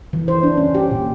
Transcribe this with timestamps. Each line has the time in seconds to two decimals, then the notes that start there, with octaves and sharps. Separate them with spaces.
0.13 E3
0.28 C5
0.43 D4
0.57 C#4
0.75 G4
0.91 A#2